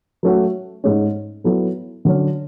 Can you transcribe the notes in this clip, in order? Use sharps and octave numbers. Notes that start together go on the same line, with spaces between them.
F#3 A3 C#4 F#4
G#2 G#3 C#4
F#3 B3 E4 A4
D3 F#3 C#4